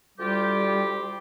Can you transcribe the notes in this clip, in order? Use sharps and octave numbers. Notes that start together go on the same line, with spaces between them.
D2 G3 F4 G4